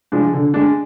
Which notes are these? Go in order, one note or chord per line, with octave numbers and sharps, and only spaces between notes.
F3 G#3 D4
D3
G#3 D4